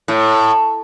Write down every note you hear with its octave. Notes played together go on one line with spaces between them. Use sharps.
A2